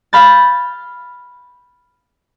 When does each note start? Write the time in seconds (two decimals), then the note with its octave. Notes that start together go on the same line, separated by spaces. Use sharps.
0.13 F5 B5 G6 A6